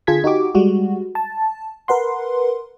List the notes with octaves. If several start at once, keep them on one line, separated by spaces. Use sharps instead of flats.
D3 F4 G#4 A5 G#6 B6
D#4 F#4 G4 D6
G3 G#3 F#4
A5
A#4 B4 F#5 C6